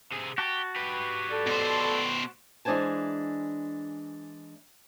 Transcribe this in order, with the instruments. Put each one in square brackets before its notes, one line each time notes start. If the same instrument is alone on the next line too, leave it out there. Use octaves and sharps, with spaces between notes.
[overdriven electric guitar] C3 G#4
[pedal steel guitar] F#4 A5 [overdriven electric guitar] G4
[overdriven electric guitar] G4 B4
[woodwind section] A4 D5
[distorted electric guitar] B2 C5
[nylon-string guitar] E3 G#3 D4 C5 G#5 A5